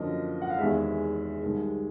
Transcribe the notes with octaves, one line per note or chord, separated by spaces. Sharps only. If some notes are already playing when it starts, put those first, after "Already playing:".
Already playing: F#2 D3 F3 A#3 D#5
F#5
F5
E2 C3 D#3 G#3 E5
C2 C3 D#3 G#3